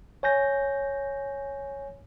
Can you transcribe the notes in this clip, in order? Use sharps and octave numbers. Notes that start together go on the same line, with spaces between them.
C#5 G#5 G6 A#6